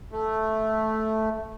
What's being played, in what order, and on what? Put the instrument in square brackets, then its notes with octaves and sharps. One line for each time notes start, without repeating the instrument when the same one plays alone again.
[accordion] A3